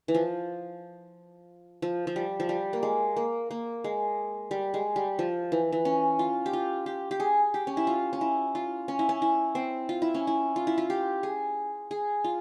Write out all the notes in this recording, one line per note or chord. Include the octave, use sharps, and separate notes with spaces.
E3
F3
F3
F3
G3
F3
G3
A#3
G#3
A#3
A#3
G#3
G3
G#3
G3
F3
E3
E3
C#4
F4
G4
F4
G4
G4
G#4
G4
C#4
E4
F4
C#4
E4
F4
C#4
E4
C#4
E4
C4
F4
E4
C#4
E4
F4
E4
F4
G4
G#4
G#4
F4